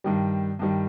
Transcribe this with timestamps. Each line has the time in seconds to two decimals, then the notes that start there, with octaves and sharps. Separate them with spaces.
0.04 G2 D#3 G3
0.59 G2 D#3 G3